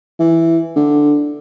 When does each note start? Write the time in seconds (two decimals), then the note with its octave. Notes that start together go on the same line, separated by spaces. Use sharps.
0.20 E3
0.76 D3